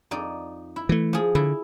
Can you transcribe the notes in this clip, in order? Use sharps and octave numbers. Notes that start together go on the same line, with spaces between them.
F2 D#4 D5
E4
E3 A3
F3 G#4
D3 E4